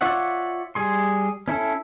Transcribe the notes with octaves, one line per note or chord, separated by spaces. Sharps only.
F4 C#5 D5 E5 F#5
G3 G#4 C6
C#4 E4 A4